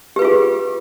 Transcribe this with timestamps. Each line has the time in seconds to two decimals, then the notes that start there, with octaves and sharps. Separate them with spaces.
0.16 G4
0.19 B4
0.22 F4
0.25 G#4